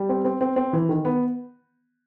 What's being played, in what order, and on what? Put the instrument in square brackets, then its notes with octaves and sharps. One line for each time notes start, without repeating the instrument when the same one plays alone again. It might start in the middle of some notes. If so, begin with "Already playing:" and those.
Already playing: [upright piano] G3
C4
C4
C4
C4
E3
D#3
B3